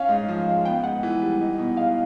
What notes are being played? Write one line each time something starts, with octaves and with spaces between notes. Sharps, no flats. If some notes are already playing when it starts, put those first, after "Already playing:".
Already playing: C#4 F5
G#2
F3
G#3
B3 G5
G#2 F#5
E3
G3
D#4
B2
G#3 F5